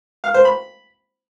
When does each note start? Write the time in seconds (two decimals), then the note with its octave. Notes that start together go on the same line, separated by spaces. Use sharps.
0.24 F5
0.34 C5
0.45 B5